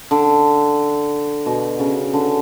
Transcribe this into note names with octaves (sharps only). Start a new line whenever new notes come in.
D3
B2
C#3
D3